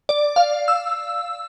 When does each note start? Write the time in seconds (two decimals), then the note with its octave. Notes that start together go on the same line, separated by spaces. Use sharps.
0.09 D5
0.36 F5
0.68 E6